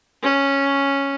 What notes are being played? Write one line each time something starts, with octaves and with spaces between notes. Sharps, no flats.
C#4